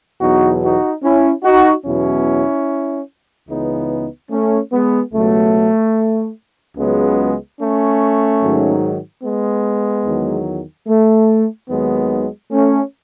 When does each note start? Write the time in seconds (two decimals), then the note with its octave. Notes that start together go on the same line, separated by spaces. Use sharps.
0.20 E2 B2 F#3 D#4 F#4
0.62 D#4 F#4
1.03 C#4 E4
1.43 D#4 F#4
1.84 E2 B2 F#3 C#4 E4
3.49 C#2 C#3 E3 B3 D#4
4.30 A3 C#4
4.72 G#3 B3
5.13 C#2 B2 F#3 A3
6.77 C#2 C#3 F#3 G#3 B3
7.59 A3 C#4
8.41 G#2 D#3 F#3
9.23 G#3 B3
10.05 E2 D#3 F#3
10.87 A3
11.69 D#2 D#3 F#3 G#3 B3
12.52 A3 C#4